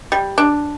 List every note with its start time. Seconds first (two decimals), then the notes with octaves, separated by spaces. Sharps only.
0.12 G3
0.38 D4